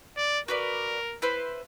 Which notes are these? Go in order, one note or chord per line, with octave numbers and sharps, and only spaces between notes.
D5
F#4 A#4 B4 D5
E4 B4 C5